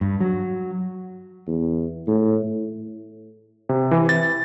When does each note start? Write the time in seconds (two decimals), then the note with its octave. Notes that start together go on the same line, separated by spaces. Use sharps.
0.01 G2
0.20 F#3
1.47 E2
2.07 A2
3.69 C3
3.91 E3
4.09 A6